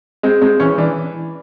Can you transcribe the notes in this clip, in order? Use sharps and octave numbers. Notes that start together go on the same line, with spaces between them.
G#3 C4
G#3 C4
E3 C#4
E3 D4